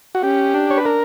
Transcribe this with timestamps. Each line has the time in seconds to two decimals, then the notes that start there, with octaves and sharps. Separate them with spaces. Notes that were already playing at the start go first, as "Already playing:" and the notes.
0.15 F#4
0.23 C#4 G4
0.54 D4
0.70 C#5
0.77 B4
0.85 A#4